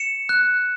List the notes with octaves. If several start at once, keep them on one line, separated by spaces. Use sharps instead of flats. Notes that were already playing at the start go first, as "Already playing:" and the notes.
Already playing: C#7 E7
F#6